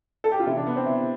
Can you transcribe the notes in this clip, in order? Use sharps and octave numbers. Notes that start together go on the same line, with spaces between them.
A4
G4
F4
C3 E3 E4
D4
B3
C4
E4